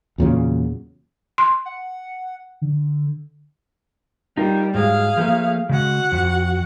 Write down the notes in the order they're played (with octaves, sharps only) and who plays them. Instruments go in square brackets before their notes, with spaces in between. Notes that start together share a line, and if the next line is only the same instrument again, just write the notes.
[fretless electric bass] E2 A#2 C#3 F#3
[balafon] C6
[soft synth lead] F#5
D3
[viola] G3 [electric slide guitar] D#4 F4 A#4
[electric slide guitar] G#2 F#3 G#3 [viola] G#4 F5
[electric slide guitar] F3 A3 A#3
[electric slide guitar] C#3 G#3 [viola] F#4 F#5
[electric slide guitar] F2